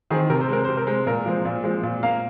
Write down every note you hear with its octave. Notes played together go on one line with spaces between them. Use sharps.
D#3 C4 G#4
C3 A#4
C5
G#3 C4 A#4
C3 C5
A#4
G#3 C4
A#2 A#4
F3 G#3 C4
A#2
F3 G#3 C4
A#2
A#3 F5